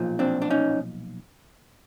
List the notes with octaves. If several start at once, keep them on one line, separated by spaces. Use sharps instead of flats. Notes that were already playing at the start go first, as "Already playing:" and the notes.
Already playing: B1 A#2 F3
C4 D4
D4
C#4 D#4